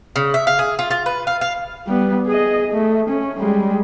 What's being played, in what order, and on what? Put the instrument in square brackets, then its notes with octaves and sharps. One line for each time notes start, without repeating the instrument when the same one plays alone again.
[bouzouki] C#3
E5
F5
G#4
F4
F4
B4
F5
F5
[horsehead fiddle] G3 B3
G#4 D#5
A3
C#4
G3 G#3